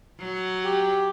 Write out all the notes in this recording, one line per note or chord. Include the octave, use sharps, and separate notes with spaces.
F#3
G4